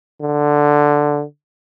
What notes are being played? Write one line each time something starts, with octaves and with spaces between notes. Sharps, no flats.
D3